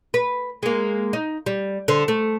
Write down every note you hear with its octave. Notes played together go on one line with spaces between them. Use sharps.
B4
G#3 A#3
D#4
G3
D3 C5
A3